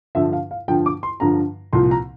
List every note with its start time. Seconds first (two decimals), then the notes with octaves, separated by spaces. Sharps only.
0.15 G2 D3 F3 E5
0.33 F5
0.51 F5
0.68 G2 D3 F3 G5
0.86 D6
1.03 C6
1.20 G2 D3 F3 A#5
1.73 C2 A#2 F3 C6
1.91 A#5